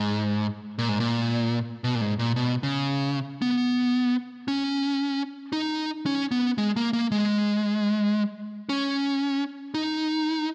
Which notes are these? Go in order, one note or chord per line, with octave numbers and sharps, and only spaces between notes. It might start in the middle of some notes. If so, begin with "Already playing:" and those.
Already playing: G#2
A#2
G#2
A#2
B2
A#2
G#2
A#2
B2
C#3
B3
C#4
D#4
C#4
B3
G#3
A#3
A#3
G#3
C#4
D#4